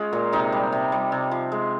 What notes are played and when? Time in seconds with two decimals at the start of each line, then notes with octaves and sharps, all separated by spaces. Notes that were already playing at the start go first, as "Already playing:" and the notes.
Already playing: G#3 C#4 F4
0.13 A#2
0.32 C3 D#4
0.53 G3
0.72 C3
0.92 G3
1.12 C3
1.31 F3
1.52 G#3